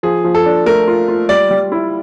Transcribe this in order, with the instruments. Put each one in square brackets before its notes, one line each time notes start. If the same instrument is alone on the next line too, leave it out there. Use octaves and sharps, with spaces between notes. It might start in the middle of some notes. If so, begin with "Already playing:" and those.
[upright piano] F3 [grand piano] G#4
[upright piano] F3
[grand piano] A4
[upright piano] D4
[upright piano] A3 [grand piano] A#4
[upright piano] F4
F4
[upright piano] G3 [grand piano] D5
[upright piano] G3
E4